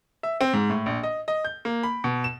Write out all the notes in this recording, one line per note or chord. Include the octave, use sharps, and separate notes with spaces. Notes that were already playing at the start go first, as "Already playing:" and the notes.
E5
C4
G#2
A2
A#1
D#5
D#5
G6
A#3
B5
B2
E7